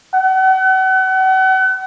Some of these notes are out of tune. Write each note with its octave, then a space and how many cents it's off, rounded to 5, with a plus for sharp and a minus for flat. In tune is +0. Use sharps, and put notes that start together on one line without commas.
F#5 +35